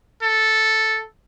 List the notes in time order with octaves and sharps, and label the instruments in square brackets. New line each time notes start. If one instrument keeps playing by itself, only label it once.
[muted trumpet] A4